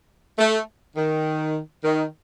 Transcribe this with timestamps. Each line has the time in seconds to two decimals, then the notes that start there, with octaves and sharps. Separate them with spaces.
0.39 A3
0.96 D#3
1.83 D#3